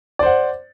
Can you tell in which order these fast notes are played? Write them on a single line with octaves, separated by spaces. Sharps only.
D5 C5 F#5